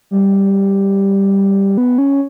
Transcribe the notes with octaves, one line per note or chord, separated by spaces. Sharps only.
G3
B3
C#4